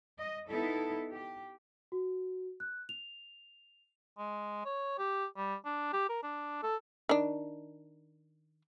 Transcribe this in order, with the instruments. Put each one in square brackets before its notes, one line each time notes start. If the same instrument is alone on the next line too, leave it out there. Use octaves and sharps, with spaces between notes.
[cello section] D#5
B3 D#4 E4 A4
G4
[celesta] F#4
F#6
F7
[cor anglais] G#3
C#5
G4
G3
D4
G4
A#4
D4
A4
[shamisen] D#3 D4